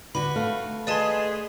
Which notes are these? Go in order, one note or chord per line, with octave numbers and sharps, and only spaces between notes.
D3 F#4 B4 B5
A3 A4 F5
G#4 B4 D5 D#5 A5 C6